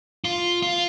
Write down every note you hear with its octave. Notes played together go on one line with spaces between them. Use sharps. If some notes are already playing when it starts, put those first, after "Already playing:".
F4
F4